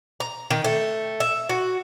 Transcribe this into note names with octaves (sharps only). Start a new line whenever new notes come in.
A#5
D#3
A3
E5
F#4